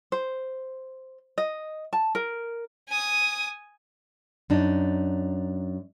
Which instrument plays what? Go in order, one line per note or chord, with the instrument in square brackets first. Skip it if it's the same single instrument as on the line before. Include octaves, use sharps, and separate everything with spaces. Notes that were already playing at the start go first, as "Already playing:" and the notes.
[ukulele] C5
D#5
A5
A#4
[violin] G#5 D#6
[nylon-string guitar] F#2 D4 D#4